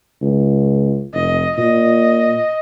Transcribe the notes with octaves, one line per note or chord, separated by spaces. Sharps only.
C#2
F1 D#5
A#2 D#5